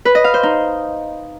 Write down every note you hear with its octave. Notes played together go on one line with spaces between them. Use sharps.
B4
D#5
F5
C5
D#4